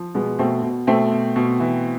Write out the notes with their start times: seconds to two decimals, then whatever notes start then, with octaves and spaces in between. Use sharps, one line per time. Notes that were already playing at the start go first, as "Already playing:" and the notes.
Already playing: F3
0.15 B2 G#3 B3
0.39 B2 A3 C4
0.63 B2
0.87 B2 A3 C4
1.12 B2
1.36 B2
1.60 E3